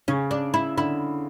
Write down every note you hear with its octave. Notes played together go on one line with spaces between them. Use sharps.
C#3 C#4
D4
E4
D3 E4